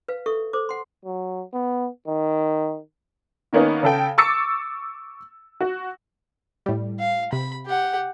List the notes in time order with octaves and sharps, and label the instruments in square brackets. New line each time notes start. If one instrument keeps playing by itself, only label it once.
[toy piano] B4 F5
A4 E5 C#6
A4 C5 D6
F#5 C6
[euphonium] F#3
B3
D#3
[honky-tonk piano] D#3 A#3 B3 C#4 D#4
C#3 A4 G5
C#6 D6 E6 A6 C#7
F#4
[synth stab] A2 G3
[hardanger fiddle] F5
[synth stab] C3 [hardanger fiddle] B5
[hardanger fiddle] G4 F#5